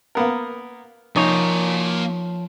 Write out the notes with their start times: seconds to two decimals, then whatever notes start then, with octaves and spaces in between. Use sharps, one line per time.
0.15 A#3 B3 A#4
1.16 F3 A#3 D#4 C#5 G#5